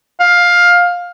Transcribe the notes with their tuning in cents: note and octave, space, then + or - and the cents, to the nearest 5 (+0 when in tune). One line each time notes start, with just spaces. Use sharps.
F5 +15